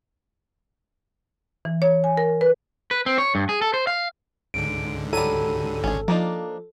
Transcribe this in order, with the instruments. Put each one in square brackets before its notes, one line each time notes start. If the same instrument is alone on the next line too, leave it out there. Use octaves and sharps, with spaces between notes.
[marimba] E3
C#5
G#5
A#4
B4
[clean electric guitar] B4
C4
C#5
G2
G#4
A4
C5
F5
[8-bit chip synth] C#2 G#2 D3 [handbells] D7
[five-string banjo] F#3 G3 [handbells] A4 [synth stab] D#7
[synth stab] G#1 [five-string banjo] C#4 G#4
[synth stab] F3 [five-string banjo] A#3 D4 D#4